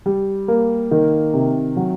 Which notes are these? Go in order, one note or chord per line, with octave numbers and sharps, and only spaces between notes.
G3
A#3
D#3
C3
F#3